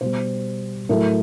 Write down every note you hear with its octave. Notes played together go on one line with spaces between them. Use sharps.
B2 G3 C5
A2 F#3 A3 A#4